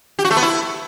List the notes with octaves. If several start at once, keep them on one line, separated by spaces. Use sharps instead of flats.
G4
F#4
A3
B3
E4